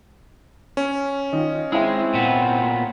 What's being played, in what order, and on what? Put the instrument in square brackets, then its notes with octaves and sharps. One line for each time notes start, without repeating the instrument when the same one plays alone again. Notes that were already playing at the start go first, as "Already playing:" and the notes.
[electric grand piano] C#4
[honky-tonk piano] D#3 F4 [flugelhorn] D#5
[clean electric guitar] G#3 [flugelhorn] C4 [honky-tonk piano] E4 E5 G5
[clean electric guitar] A#2 B3